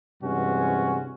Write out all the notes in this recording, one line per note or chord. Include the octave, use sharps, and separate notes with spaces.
G2 C3 E3 G#3 C#4 F#4